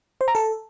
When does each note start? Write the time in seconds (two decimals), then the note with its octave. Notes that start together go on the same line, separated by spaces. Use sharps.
0.21 C5
0.28 A#5
0.35 A4